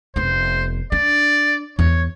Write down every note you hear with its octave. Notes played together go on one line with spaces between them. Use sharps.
F1 B3 C5
D4 D5
E2 C#5